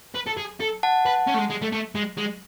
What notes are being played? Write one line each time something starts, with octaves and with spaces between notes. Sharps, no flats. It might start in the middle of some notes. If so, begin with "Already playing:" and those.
B4
A4
G#4
A4
F#5 A5
B4
C#4
A3
G#3
G#3
A3
A3
G#3
G#3